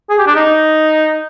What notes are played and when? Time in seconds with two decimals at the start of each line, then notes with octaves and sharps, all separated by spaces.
0.09 G#4
0.18 G4
0.27 D4
0.36 D#4